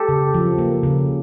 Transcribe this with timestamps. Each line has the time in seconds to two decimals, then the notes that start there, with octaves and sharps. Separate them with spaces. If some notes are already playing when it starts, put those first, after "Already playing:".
Already playing: G4 A4
0.09 C#3
0.34 F3
0.58 A#3
0.83 C#3